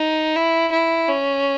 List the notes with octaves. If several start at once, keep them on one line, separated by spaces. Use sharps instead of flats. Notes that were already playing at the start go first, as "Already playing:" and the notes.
Already playing: D#4
E4
E4
C#4